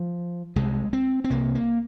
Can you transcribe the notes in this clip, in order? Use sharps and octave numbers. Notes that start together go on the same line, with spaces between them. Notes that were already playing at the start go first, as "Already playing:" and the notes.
Already playing: F3
C2 C3 G#3
C4
C4
C2 C3 A#3
A#3